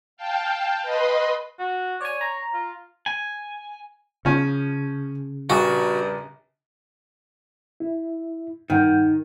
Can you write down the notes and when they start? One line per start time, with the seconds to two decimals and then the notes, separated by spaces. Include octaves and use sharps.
0.17 F5 G5 A5
0.82 B4 D#5 B5 C6
1.59 F#4
2.01 C#5 D5 G#5
2.21 A#5
2.54 F4
3.06 G#5
4.25 C#3 F3 C#4
5.50 A#1 G2 F#4 G#4
7.80 E4
8.70 G2 D#3 F#5 G6